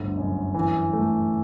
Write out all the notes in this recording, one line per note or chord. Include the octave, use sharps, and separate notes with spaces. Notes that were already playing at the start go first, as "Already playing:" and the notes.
Already playing: G1 D2
F#2
E3
A3